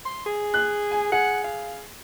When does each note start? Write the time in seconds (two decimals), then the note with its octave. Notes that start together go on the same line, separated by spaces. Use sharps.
0.05 C6
0.26 G#4
0.54 F#6
0.91 G#5
1.12 G#4 F#5
1.45 F5